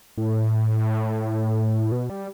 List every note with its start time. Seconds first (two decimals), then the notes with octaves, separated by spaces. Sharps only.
0.17 A2
1.92 B2
2.09 G3